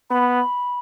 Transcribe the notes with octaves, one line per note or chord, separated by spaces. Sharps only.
B3 B5